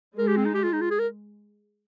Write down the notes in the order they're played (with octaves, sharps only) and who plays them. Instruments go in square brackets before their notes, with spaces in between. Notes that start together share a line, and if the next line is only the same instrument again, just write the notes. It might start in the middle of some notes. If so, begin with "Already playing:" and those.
[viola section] G#3 [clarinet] A#4
[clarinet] G4
C4
D#4
G4
F4
D#4
F4
G#4
A#4